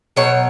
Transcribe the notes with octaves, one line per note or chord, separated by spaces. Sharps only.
B2 F#3 C#5